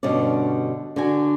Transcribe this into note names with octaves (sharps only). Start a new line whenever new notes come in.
G2 B2 D3 C#4 D5
D3 D4 F#4 G#5